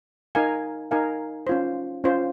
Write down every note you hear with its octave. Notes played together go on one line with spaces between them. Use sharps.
D#4 A#4 F5 G#5
D#4 A#4 F5 G#5
C#4 F4 C5
C#4 F4 C5